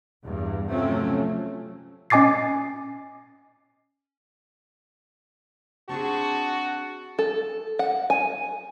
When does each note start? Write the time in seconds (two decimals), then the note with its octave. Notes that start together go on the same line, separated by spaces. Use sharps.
0.24 E2 G2
0.70 C3 F3 F#3 A3 C4 C#4
2.10 C#4 D#5 G#5 D6 A6 C7
5.89 C4 D4 F#4 G#4 A5 C#6
7.19 A4
7.79 F#5
8.10 G#5